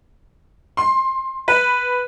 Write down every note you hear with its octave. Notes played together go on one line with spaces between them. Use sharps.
C6
B4